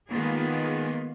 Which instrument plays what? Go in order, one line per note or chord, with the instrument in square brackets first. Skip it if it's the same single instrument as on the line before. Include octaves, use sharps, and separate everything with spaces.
[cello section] D#3 G#3 A#3 B3 F4 G#4